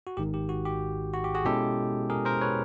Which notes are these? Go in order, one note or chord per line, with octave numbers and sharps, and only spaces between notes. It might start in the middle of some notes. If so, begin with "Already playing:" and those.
F#4
G#1 G#2 D#3 G4
G4
F#4
G4
F#4
G4
F#4 G#4
B2 G#3 C#4 E4 G4 A4
G#4 A#4
A#4 C5
B4 C#5